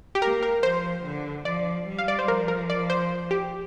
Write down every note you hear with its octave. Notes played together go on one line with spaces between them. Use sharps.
G4
A#3 A#4
A#4
F3 C5
D3
F3 D5
G3
F5
D5
C5
F3 A#4
A#4
D5
C5
G4